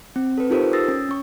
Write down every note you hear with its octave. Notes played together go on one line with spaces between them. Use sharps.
C4
A4 B4
D#4 F4 G4 A4 A#4 C5
D#6 E6 A6 A#6 C7
C#4
C#4 C#6